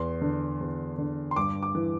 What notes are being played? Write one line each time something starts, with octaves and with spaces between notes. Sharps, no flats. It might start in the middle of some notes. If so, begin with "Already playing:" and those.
Already playing: E2 C6
D3
E2
D3
C6
G2 D6
D6
E3